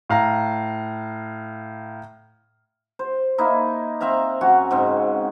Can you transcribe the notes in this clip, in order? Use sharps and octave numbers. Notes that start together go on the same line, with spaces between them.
A2 F5 A#5
C5
A#3 D#4 E4
C4 E5 F5 A#5
F#2 F#4 F#5 G#5
G#2 C#3 C4